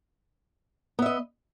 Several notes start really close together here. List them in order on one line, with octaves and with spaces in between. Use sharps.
B3 E5 D#5